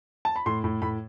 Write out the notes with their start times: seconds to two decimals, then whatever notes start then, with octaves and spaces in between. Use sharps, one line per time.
0.25 A5
0.36 B5
0.46 A2 C6
0.64 A2
0.82 A2 B5